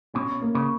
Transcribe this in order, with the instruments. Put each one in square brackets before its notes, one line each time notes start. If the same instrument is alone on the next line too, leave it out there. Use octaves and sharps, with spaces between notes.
[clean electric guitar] B2 [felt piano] C#4
[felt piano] A#3
[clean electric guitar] C#3